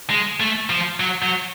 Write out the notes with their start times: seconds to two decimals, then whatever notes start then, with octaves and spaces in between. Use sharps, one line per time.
0.10 G#3
0.40 A3
0.70 F3
1.00 F#3
1.23 F#3